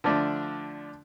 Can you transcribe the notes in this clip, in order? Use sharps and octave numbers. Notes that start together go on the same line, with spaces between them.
D3 F3 A3 D4